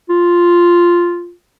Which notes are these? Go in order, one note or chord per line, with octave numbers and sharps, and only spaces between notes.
F4